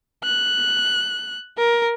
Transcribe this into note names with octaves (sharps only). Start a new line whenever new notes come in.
F#6
A#4